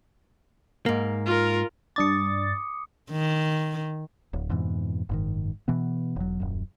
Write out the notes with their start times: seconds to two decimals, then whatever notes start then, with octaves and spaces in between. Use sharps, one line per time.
0.86 G#2 A#3
1.26 F4 A#4
1.96 G2 D4 D6 D#6 A6 C#7
3.11 D#3
4.33 D1
4.49 F2 G#2 B2 E3
5.09 F#1 G#2 D#3
5.68 B2 E3 B3
6.16 E1 F#3
6.40 D#1 F#2